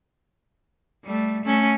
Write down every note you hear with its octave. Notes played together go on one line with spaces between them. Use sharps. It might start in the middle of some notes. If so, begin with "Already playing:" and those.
G3 A3
A3 C#4